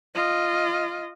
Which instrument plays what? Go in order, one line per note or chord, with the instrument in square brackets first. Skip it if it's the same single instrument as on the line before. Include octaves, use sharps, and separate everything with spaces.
[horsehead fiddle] F4 D#5